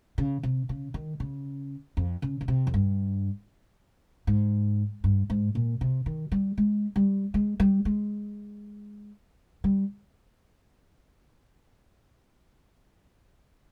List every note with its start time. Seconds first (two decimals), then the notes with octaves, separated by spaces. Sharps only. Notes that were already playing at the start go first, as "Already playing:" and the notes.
0.18 C#3
0.43 C3
0.69 C#3
0.94 D#3
1.20 C#3
1.97 F2
2.22 C#3
2.41 C#3
2.48 C3
2.67 F2
2.74 G2
4.27 G#2
5.04 G2
5.30 G#2
5.55 A#2
5.81 C3
6.06 D#3
6.32 G3
6.58 G#3
6.96 G3
7.34 G#3
7.60 G3
7.85 G#3
9.64 G3